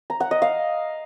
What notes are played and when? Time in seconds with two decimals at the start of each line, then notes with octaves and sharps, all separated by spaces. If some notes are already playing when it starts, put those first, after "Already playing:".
0.10 A#5
0.20 F#5
0.31 D#5
0.42 F5